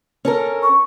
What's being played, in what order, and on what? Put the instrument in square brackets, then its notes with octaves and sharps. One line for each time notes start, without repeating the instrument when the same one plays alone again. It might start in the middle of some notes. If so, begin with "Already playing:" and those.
[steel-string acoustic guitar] C#4 A4 A#4
[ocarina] C#6